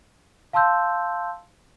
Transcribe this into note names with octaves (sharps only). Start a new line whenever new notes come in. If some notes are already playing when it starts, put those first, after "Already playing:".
F5 A5 C6 E6 G6